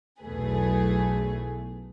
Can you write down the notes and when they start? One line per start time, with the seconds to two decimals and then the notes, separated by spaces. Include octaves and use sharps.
0.20 B1 E2 A3 G#4 B4